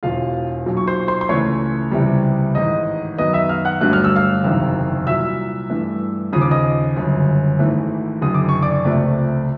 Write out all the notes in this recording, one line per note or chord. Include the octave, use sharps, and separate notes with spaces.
E1 E2 B2 F4 F5
B1 A#2 F#3
C#6
C5 C6
C5 C6
C6
C#2 C#3 E3 A3 C#5 C#6
C#2 C3 E3 G3
A1 G#2 D#3 D#5 D#6
F#2 D#3 F#3 B3 D#5 D#6
E5 E6
F5 F6
F#5 F#6
G1 G2 D3 F#3 A3 F#6
F6
E6
F5 F6
F#1 E2 C3 D#3
C2 A#2 F#3 E5 E6
G2 E3 A3
D#2 C#3 F3 D#6
D6
D#5 D#6
G1 F#2 C#3
G#1 G#2 E3 A3
F#1 F#2 D3 D#6
D6
C#6
D5 D6
C#2 C3 F3 A3